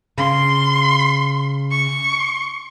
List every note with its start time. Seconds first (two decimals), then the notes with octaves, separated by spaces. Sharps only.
0.18 C#3 C6
1.71 C#6